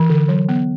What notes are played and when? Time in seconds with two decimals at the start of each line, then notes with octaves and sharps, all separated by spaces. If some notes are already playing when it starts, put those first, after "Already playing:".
Already playing: E3
0.10 D3
0.29 F#3
0.49 B3